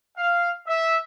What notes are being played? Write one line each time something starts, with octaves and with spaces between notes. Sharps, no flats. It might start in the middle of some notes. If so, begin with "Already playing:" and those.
F5
E5